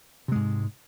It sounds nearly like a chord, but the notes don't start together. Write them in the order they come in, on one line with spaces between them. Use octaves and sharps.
C3 G#3 G#2